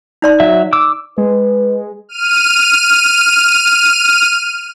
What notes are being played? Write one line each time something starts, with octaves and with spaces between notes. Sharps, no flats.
D#4 D5 C6
F#3 E5
D6 E6
G#3 B4
F6 D#7